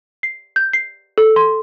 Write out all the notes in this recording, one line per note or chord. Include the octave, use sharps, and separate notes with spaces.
C7
G6
C7
A4
C6